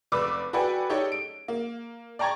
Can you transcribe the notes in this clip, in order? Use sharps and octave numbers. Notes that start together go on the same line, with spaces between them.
F1 B4 D5 D6 E6
F#4 A4 B4 D5 G5 G#5
D#4 G4 A4 C#5 D5
D7
A#3
D5 G5 A#5 C#6 G#6 A6